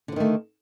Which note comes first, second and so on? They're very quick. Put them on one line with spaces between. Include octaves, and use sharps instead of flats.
D3 F3 D#3 A3